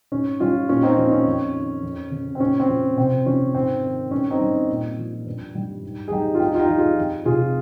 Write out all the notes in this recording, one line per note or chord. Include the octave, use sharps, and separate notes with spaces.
G#2 C#4
G3 C#4 F4
A#2 C#4 F4
C4 D#4
F3 C#4
C#4
F2
D#3
F2
C#3
C4
A#2 C#4
C4
F3
C3 C4
F3 C#4
G#2 C4
D#3
G2 C#4
C4 D#4
G3
A#2
F3
G2
G3
G#2
G#4
G3 D#4 G4
F4
G2 D#4 G4
F4
D#4 G4
F3
F4 G#4
F2
C3 F4 G#4